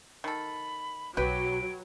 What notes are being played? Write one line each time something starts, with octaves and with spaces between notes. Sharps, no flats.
D#3 A4 B5
B1 F#3 G4 B4 D7